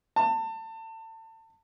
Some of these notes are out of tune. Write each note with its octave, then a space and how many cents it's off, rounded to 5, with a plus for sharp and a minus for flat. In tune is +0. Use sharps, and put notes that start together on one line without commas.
A5 +30